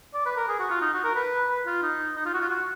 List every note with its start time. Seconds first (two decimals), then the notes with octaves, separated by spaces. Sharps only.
0.14 D5
0.25 B4
0.36 A#4
0.48 G#4
0.59 F#4
0.70 F4
0.81 D#4
0.93 F#4
1.04 A#4
1.15 B4
1.49 B4
1.66 F4
1.83 D#4
2.16 D#4
2.25 F4
2.33 F#4
2.41 F4
2.49 F#4